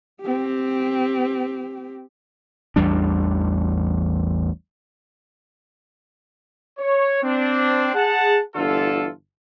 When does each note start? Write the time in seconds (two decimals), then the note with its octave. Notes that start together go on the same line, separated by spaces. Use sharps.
0.21 C4 G4
2.76 A1 E2 G3 D4
6.79 C#5
7.23 C4 D4
7.94 G#4 F#5 A5
8.55 G1 D3 E3 F4 A4